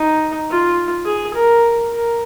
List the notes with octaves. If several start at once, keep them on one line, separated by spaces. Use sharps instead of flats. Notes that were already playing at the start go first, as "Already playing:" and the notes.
Already playing: D#4
F4
G#4
A#4
A#4